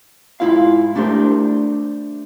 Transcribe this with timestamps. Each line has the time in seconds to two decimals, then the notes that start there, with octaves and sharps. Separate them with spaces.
0.40 G#2 E3 E4 F4 F5
0.95 A3 D4 G4 A#4 C5